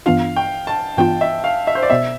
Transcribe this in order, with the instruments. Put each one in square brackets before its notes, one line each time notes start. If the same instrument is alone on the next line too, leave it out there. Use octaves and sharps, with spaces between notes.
[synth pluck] G2 E3 B3 D4 F4 [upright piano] F5
[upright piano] G5
A5
[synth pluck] G2 E3 B3 D4 F4 [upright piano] G5
[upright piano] E5
F5
E5
C5
D5
[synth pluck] B2 B3 [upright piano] E5